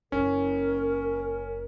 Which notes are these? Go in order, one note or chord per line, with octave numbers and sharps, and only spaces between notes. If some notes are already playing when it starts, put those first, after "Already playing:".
F#1 A#3 C#4 A#4